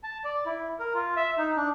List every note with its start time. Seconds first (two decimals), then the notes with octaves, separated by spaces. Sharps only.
0.03 A5
0.24 D5
0.46 E4
0.79 A#4
0.94 F4
1.16 E5
1.38 D#4
1.57 D4